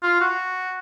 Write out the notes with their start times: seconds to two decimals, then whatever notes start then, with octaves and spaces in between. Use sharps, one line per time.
0.03 F4
0.21 F#4